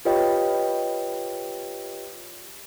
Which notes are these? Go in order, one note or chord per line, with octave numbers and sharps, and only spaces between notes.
F4 G4 B4 C#5 D#5 G5